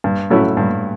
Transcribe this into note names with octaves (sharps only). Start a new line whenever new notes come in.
G2
F#3 A3 C#4 E4
G2